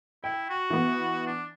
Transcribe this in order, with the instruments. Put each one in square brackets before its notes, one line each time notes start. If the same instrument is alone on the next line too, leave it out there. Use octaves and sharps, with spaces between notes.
[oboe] E4 [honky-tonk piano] G5
[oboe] F#4
[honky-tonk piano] E3 B3
[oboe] D4